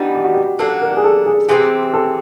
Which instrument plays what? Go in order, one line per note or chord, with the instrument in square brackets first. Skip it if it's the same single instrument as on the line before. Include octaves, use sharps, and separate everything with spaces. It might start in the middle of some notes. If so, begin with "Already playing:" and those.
Already playing: [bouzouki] E3 G3 B3 D#4 [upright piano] D4
[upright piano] G4
F#4
G4
[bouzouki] F#3 A#3 D4 [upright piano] A4
[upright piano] A#4
G4
G#4
A4
G#4
[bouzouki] C3 E3 A3 C4 [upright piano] G#4
[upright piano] A4